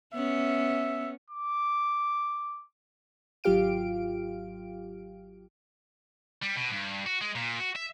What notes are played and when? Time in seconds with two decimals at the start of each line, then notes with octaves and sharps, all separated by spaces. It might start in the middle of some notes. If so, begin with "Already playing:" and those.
0.14 B3 C#4 E5
1.31 D6
3.44 G#1 F#3 F4 G4 F5 D7
6.43 G3
6.56 B2
6.71 G2
7.06 F#4
7.21 G#3
7.35 A#2
7.60 F#4
7.75 E5